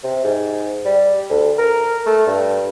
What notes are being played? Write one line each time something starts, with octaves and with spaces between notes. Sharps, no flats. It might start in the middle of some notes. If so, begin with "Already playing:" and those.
C3
G#2
G3
D2
A#4
A3
G2